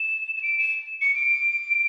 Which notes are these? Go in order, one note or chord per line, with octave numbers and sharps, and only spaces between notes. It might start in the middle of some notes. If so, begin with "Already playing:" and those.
Already playing: E7
E7
D7
E7
C#7
D7